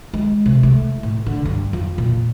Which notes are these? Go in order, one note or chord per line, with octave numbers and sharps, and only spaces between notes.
G#3
C3
A3
A2
D3
G2
F2
A#2